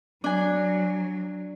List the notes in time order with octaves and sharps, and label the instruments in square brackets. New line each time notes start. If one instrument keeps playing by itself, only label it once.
[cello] F#3 [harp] D4 G#5